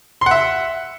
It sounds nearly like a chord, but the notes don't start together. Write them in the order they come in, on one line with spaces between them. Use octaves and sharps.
C6 F#5 E5